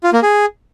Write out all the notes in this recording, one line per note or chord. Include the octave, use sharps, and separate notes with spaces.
F4
A#3
G#4